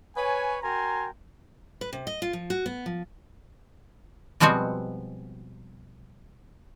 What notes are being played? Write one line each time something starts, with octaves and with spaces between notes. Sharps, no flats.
B4 C#5 G#5
F#4 A#4 G5 G#5 A#5 C6
B4
C3
D#5
F4
F3
F#4
B3
F3
B2 F3 G3 G#3 C4 F#4